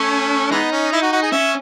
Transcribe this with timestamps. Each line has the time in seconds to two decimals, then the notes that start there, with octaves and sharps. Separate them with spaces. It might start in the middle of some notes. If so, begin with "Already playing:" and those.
Already playing: A3 C#4
0.51 E3 G#3 B3 D#4
0.72 C#4
0.92 E4
1.02 F#4
1.13 F#4
1.23 G#4
1.32 C#4 E5